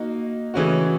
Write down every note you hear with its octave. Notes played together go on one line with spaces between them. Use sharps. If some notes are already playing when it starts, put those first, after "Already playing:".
Already playing: A#3 D#4 F#4
C#3 E3 A3 C#4 F#4